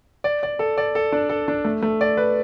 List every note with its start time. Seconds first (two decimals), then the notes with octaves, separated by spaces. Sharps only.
0.24 D5
0.43 D5
0.59 A4
0.78 D5
0.95 A4
1.12 D4
1.29 A4
1.48 D4
1.65 A3
1.82 A3
2.01 D5
2.17 B4